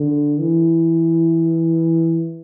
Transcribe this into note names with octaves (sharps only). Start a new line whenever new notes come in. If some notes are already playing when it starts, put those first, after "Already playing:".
Already playing: D3
E3